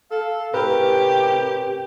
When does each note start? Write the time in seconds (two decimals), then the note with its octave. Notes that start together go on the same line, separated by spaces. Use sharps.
0.11 A4 F5
0.54 A2 C3 C#4 G4 A#4 B4